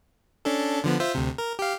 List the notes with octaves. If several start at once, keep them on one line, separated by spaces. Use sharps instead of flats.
C#4 D4 A4
D3 F3 B3
F4 C5 E5
D2 C3
A#4
G4 F5